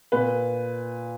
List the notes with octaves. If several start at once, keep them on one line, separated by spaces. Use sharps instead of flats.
A#2 B4